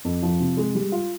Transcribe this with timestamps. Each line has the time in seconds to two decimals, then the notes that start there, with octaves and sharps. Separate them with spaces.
0.05 F2
0.23 F3
0.40 C3
0.57 G#3
0.75 G3
0.92 F4